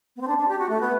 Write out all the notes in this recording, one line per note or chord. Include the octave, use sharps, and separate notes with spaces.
B3
C4
D4
D4
G4
F#4
A3
B3